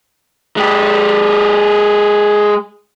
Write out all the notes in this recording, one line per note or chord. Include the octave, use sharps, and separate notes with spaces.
G#3 G4